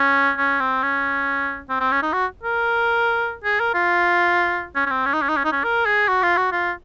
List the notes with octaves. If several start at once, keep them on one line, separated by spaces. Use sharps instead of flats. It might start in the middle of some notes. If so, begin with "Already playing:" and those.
Already playing: C#4
C#4
C4
C#4
C4
C4
C#4
D#4
F#4
A#4
G#4
A#4
F4
C#4
C#4
C4
C#4
D#4
C#4
D#4
C#4
D#4
C#4
A#4
G#4
F#4
F4
F#4
F4